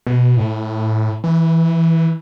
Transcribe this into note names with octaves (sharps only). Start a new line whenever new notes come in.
B2
A2
E3